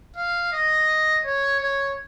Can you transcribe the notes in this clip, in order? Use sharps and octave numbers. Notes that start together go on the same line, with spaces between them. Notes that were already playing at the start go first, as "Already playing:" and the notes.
F5
D#5
C#5
C#5